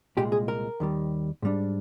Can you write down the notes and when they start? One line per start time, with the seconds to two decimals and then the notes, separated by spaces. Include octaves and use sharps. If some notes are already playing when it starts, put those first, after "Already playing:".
0.17 C2 A#2 G#3 G4
0.32 G#4
0.48 A#4
0.80 D#2 D#3 G3
1.42 G#2 G3 D4